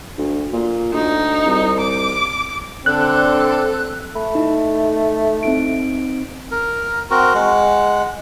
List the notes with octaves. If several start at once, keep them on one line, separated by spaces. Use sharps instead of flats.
D2
A#2
D2 D#4
C2
D6
D3 C4 D4 A4 F#6
A3 B5
D#4 E4
C4 D#4 D7
A#4
C4 F#4 A#4
G#3 F#5